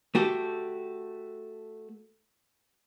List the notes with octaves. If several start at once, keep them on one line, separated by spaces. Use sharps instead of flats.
A3 F#4 G4 A4